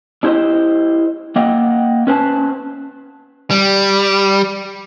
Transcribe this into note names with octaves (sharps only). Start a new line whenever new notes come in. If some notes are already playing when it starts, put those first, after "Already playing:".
D4 E4 G4 A4 C5 D#5
A#3 D#5 F#5 G5
C#4 B4 C5 G5 A5
G3